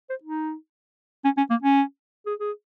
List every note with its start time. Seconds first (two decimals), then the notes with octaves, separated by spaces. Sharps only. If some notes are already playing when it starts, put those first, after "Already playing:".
0.10 C5
0.23 D#4
1.24 C#4
1.37 C#4
1.50 A#3
1.62 C#4
2.26 G#4
2.40 G#4